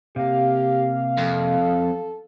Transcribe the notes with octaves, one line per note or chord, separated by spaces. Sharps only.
C3 A#3 G4 F5
F2 A4